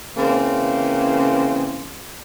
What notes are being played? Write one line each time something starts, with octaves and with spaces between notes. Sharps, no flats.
C#3 E3 A#3 C4